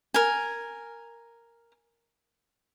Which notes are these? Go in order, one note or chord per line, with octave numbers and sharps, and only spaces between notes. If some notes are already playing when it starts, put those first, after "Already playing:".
A#4 G#5